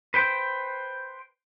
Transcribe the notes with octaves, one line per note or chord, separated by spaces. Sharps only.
B4 C5 G5